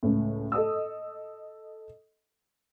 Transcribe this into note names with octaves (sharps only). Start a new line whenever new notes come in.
C#2 A2
A4 D#5 D#6 E6